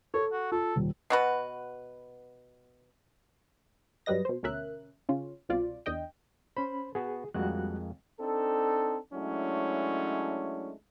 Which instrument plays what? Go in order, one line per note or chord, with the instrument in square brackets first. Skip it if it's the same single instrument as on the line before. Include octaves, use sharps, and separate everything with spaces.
[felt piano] A4 [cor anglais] C#5
[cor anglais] F#4
[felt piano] F4 [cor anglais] A4
[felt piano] D#1
[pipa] B2 F#4 B4
[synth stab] G2 F#3 G3 B4 D#5 A#6
B2 C5
D2 B2 C#4 A#4 E5 F#6
C#3 C#4 F4
C2 B2 C4 F4 D5
E2 D4 D#5 G5
[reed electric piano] C#4 B5 [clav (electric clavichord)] C5
[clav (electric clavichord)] B3 F#4 [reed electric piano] G#4
[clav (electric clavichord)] F2 G#3 A#3 [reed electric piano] G3 F#4 F#6
[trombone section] C4 D4 D#4 A4
F#3 G#3 A3 C#4 D4 E4